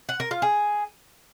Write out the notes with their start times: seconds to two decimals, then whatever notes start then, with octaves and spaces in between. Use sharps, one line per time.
0.09 F#5
0.20 A#4
0.31 F4
0.42 G#4